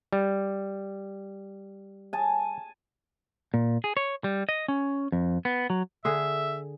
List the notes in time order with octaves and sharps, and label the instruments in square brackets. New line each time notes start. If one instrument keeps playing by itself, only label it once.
[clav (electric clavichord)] G3
[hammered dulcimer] G#5 A5
[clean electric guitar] A#2
G#4
C#5
G3
D#5
C#4
F2
B3
F#3
[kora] D3 G#4 [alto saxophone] E5